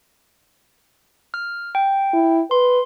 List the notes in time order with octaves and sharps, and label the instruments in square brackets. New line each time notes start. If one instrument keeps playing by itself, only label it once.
[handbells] F6
G5
[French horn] E4
[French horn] B4 [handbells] C6